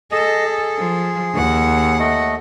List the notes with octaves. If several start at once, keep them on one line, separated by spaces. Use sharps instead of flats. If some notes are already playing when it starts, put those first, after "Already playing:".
G#4 A4 D#5
G#4
F3
D#2 F#5
A3 D#5